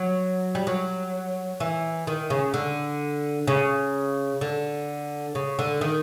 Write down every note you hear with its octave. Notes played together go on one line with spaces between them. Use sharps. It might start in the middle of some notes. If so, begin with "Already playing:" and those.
Already playing: F#3
G3
F#3
E3
D#3
C#3
D3
C#3
D3
C#3
D3
D#3